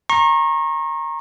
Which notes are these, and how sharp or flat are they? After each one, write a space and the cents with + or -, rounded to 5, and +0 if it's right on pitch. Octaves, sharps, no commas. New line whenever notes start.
A#5 +0 C#6 -35